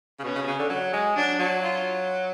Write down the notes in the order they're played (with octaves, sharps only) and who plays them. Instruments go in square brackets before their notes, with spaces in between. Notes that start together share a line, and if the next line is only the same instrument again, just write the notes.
[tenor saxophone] C#3
[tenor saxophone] B2 [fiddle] C#4
[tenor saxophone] C#3
B2
C#3
D3
F#3
G#3
[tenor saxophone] F#3 [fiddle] D4
[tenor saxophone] F#3
[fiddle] F4